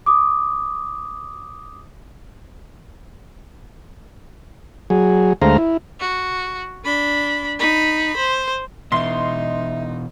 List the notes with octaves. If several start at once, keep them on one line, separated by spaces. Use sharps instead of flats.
D6 D#6
F#3 G#4
D2 G#3 A3 C5 F5 A#5
E4
F#4
D4 B5
D#4 B5
C5
B2 E3 D#4 E5 C6